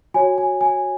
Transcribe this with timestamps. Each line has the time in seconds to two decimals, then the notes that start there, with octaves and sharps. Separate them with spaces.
0.14 F#4 C#5 G#5
0.38 G#5
0.61 G#5